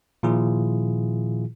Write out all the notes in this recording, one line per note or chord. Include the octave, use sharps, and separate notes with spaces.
A#2 D#3 F3 E4 F4 G#4